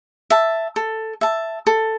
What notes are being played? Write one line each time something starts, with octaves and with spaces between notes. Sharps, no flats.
E5 A5
A4
E5 A5
A4